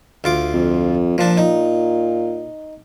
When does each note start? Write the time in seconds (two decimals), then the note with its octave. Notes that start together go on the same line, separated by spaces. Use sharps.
0.24 D2 F4 D6
0.54 F2
1.18 A#2 F3 D4
1.38 D#4